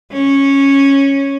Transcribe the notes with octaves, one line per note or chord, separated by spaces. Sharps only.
C#4